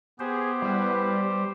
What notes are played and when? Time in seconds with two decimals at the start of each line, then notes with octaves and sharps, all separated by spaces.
0.19 B3 G4 G#4 C5
0.62 G3 E4 B4